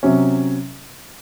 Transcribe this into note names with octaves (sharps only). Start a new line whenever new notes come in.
C3 F#3 C#4